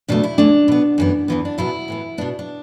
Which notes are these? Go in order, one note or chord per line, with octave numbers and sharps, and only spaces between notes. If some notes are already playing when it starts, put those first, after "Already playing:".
E2 B2 A3 D4
E4
E2 E3 A3 D4
B2 B3
F#2 E3 B3
E2 E3 B3
D4
E2 B2 F#3 B3 E4
A2 E3 B3
B2 B3 D4
D4